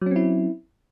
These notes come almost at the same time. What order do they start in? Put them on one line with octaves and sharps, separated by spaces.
F#3 C#4 C4 E4